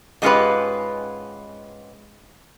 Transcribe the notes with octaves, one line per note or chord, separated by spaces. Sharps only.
G#2 G#3 C#4 F4 G4 B4